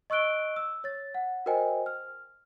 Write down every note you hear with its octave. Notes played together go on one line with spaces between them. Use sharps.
D#5 C#6 E6 F#6 D7 G7
E6
C#5 A6
F#5
F#4 A#4 C5 D#5 G5 G#5
F6